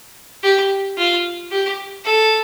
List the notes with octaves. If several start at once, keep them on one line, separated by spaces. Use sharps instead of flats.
G4
F4
G4
A4